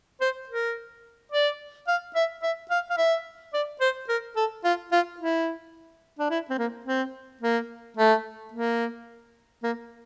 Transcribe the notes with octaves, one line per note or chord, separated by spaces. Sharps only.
C5
A#4
D5
F5
E5
E5
F5
F5
E5
D5
C5
A#4
A4
F4
F4
E4
D4
E4
C4
A#3
C4
A#3
A3
A#3
A#3